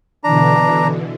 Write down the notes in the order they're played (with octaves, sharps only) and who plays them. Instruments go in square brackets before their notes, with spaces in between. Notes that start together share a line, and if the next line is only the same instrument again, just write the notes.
[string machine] B2 D3 E3 [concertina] D4 A#5